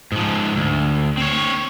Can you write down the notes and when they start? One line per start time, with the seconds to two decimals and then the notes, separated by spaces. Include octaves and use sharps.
0.12 G#2 F3
0.56 D2
1.18 C4 C#5